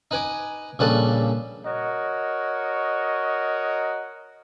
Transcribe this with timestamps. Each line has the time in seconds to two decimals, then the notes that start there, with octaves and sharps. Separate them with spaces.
0.11 D#4 B4 G#5 D6
0.79 A#1 C#3 G3 A4 B4 A5
1.66 F#4 A#4 C#5 D#5